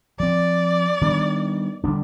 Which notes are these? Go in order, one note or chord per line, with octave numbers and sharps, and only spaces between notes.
F3 C4 D5
D#3 G3 B3 D4
D3 G3 B3 D4